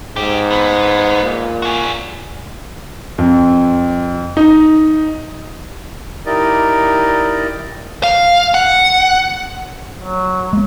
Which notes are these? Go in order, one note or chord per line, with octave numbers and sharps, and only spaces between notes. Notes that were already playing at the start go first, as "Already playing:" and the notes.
G#2 D#4 G4
B3
A#2
F#4 G#4
F2
D#4
D#4 E4 G4 A#4 D5 D#5
F5
F#5
F#3
G#3 B3